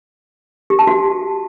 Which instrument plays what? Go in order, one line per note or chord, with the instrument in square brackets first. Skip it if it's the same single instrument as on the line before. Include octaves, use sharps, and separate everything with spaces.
[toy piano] G4
A5
F#4